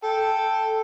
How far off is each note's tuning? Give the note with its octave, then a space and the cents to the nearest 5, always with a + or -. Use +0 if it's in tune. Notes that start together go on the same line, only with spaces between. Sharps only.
A4 +0 G5 +0